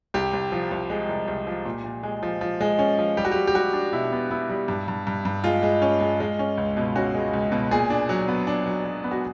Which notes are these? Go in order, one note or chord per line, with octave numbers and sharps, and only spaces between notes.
C2 G4
C2
F3
C2
G#3
C2
C2
F3
A#2
A#2
G#3
F3
F3
G#3
C#4
F3
G3 G4
F#4
G3 G4
G4
G3 F#4
D4
B2 E4
B3
B3 E4
G3
G2
G2
G2
G2
G#3 F4
G#3
C#4
G#3
G#3
C#4
C#2
B2
C#4 F#4
G#3
C#2
B2
A#2 G#4
D4
F#3
B3
D4
F#3
F#3
B3
F#4